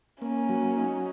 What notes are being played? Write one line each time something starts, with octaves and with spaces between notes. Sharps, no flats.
A#3 C#4
F#3
D#4